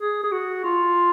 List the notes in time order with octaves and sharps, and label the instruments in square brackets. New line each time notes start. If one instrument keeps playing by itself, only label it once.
[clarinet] G#4
G#4
F#4
F4